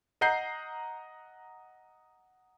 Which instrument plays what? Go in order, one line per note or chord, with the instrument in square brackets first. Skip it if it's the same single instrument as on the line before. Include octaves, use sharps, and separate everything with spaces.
[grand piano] D#5 F#5 A#5 G6 C7